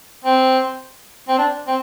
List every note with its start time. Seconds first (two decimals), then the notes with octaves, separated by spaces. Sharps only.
0.25 C4
1.28 C4
1.38 D4
1.67 C4